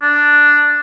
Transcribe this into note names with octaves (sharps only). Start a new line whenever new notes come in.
D4